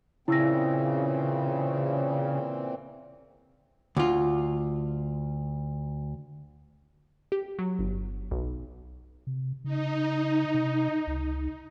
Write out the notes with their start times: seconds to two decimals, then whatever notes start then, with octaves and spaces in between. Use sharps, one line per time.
0.28 A#2 C#3 E3 C4 E4 E6 A#6
3.97 D2 F4
7.32 G4
7.59 F#3
7.79 G1
8.31 B1
9.27 C3
9.64 C#3 D#4
10.54 C3
11.07 C#2